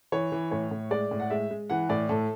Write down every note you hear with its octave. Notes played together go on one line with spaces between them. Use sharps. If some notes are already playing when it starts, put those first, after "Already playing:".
E3 C#5
E3
A2 C#5
A2
G#3 D5
A2
F#5
G#3 E5
G#3
E3 F#5
A2 D5
A2 A4